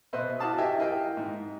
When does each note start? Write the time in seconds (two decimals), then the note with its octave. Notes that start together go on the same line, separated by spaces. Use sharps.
0.13 B2 B4 C5 D#5 E5 F#6
0.39 E4 F#4 F5 A5 D6 D#6
0.58 G4 D#5 E5 G5 G#5
0.78 E4 A#4 D#5 F5 G5
1.17 G#2